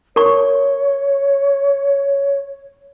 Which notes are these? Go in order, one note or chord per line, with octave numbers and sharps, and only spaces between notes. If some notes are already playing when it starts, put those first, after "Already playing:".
A#4 C#5 C#6